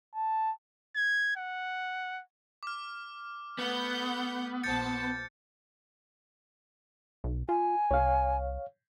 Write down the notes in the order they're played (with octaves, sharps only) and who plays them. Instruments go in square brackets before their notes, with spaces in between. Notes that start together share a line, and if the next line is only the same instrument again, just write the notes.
[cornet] A5
[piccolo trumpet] G#6
F#5
[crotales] D6 F6
[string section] A3 F#5 G6 [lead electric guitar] B3
[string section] A#1 C5 A5 [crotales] G6 A6 C#7
[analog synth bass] B1
[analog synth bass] F4 [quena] G#5
[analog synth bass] C2 [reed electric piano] C#5 F5